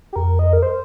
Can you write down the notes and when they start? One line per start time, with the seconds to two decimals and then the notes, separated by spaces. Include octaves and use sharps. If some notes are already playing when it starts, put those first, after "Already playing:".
0.13 G4
0.16 F2 A#4
0.39 D#5
0.53 A#4
0.63 C5